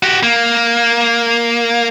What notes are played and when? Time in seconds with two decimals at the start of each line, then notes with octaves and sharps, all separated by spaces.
0.03 F#4 G4
0.23 A#3